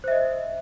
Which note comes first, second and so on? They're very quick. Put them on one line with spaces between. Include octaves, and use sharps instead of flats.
C5 E5 D#5